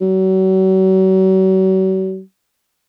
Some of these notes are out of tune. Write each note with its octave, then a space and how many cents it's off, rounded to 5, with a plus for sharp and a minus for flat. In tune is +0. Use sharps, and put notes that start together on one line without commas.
F#3 +40